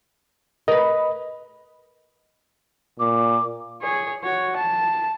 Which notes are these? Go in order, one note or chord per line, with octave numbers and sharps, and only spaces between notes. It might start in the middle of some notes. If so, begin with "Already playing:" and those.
A#4 B4 D#5
A#2 D6
G#4 C#5
F#4 C#5
A5